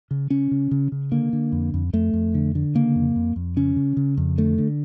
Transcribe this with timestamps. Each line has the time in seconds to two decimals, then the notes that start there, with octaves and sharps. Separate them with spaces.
0.11 C#3
0.30 C#3 C#4
0.51 C#3
0.71 C#3
0.92 C#3
1.12 D3 A#3
1.33 D3
1.52 F2
1.74 F2
1.93 F2 A3
2.13 F2
2.35 D3
2.55 D3
2.75 C#3 A#3
2.95 F2
3.16 F2
3.36 F2
3.56 C#3 C#4
3.76 C#3
3.97 C#3
4.17 F2
4.38 D3 A3
4.58 D3